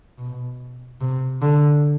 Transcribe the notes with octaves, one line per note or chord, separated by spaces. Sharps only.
B2
C3
D3